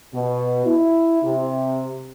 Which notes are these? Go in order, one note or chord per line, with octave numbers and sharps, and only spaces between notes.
B2
E4
C3